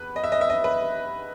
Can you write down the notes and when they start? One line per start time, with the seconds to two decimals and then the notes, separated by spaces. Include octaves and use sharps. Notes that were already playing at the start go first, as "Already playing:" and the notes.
Already playing: E2 B4
0.16 D#5
0.24 E5
0.32 D#5
0.41 E5
0.50 D#5
0.64 B4